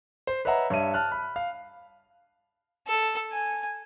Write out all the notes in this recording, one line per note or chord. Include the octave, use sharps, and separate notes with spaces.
C5
B4 C#5 D#5 E5 F#5 A#5
G2 C#5 E5 D#7
A5 F6 F#6
B5
F5
A4
G#5